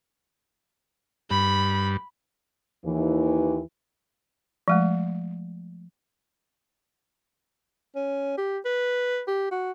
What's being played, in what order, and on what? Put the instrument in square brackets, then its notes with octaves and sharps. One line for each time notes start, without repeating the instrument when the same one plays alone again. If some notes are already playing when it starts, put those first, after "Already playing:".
[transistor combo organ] G2 [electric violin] B5
[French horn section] D#2 E3
[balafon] F3 G#3 A3
[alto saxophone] C#4
G4
B4
G4
F#4